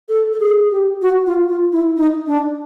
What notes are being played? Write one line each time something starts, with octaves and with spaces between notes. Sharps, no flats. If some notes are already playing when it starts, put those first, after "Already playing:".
A4
A4
G#4
G4
F#4
F4
F4
E4
D#4
D4